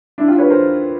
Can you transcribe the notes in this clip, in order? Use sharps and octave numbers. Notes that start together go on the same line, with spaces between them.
D4 E4
F4 G4
B4 C#5
A#4 C5